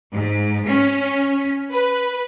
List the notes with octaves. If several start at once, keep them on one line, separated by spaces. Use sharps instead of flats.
G#2
C#4
B4